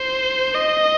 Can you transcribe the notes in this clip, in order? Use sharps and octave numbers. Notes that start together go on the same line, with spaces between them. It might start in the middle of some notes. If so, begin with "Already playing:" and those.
Already playing: C5
D#5